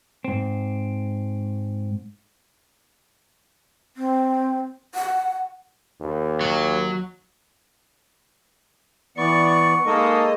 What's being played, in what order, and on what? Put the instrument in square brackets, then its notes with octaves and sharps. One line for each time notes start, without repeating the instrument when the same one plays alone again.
[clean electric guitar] G#2 C4
[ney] C4
[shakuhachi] F#5
[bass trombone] D#2
[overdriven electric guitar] F#3
[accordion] E3 B3 D5 [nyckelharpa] C#6
[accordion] G#3 D#5 [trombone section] A#3 D#4 A4